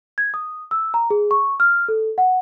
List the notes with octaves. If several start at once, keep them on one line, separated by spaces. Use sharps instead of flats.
G#6
D#6
E6
A#5
G#4
C#6
F6
A4
F#5